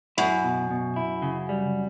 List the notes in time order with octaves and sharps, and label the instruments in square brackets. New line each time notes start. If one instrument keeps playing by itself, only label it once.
[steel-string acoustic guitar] F#2 [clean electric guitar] E4
[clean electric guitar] B2
B2
E4
C#3
G3